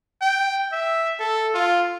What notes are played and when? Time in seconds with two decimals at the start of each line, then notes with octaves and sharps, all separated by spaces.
0.21 G5
0.72 E5
1.20 A4
1.54 F4